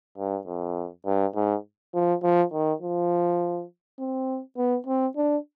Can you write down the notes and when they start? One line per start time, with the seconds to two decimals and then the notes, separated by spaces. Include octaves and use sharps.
0.18 G2
0.47 F2
1.06 G2
1.35 G#2
1.94 F3
2.23 F3
2.53 D#3
2.82 F3
3.99 C4
4.57 B3
4.87 C4
5.16 D4